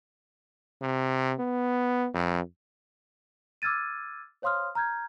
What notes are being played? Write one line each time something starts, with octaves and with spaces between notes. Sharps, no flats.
C3
B3
F2
D6 E6 F6 G#6 A6 D#7
C5 C#5 F5 C6 D#6 F6
A#5 F6 G6 G#6